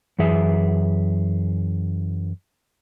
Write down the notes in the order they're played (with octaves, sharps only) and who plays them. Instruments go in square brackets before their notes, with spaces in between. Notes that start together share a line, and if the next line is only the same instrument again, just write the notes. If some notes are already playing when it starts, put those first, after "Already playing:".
[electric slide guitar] F#2 E3 G#4 E5